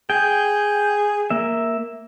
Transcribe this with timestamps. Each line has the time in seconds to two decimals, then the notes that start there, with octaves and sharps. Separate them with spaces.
0.10 G#4 G5
1.30 A#3 E5